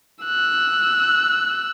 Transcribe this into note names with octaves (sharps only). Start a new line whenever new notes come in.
E6 F#6